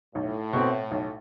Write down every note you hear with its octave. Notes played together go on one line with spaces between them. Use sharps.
B1 A2
B2 A3 C4
B1